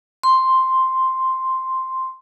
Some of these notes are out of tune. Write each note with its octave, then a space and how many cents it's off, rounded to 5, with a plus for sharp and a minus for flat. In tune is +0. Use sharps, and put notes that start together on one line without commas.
C6 +0